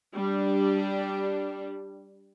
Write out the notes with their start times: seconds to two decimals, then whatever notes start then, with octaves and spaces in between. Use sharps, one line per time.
0.14 G3 D4